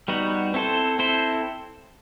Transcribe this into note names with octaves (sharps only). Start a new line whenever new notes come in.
G3 B3 D#4 F#4
C4 E4 A4 C5
C4 E4 A4 C5